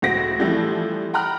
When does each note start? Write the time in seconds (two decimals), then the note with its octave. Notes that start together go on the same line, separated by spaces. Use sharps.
0.02 C#2 A2 F#4 C5 A#6 D7
0.39 E3 F3 G3 A3 C4 E4
1.13 F#5 G5 A#5 B5 F6 F#6